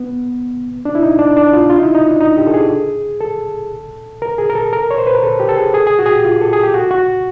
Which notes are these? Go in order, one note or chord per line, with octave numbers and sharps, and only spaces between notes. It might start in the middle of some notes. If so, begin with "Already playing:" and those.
Already playing: B3
D4
E4
D#4
D4
D4
F4
F4
D#4
E4
D#4
D4
D#4
G4
A4
G#4
A4
A#4
G#4
A#4
A4
A#4
C#5
C5
B4
A#4
A4
G4
A4
G#4
G#4
G#4
F#4
G#4
G4
F4
A4
G#4
G4
F#4
F#4